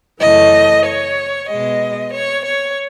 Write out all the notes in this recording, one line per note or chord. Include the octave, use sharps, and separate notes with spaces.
F#2 C#3 E3 A3 D#5
C#5
B2 G#3 D#5
C#5
C#5